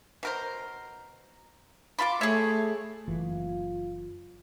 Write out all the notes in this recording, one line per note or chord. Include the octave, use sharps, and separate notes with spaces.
B2 A#4 C5
F4 A5 B5 C6 D6
A3 G#4 C#5 E5
F#1 E3 F4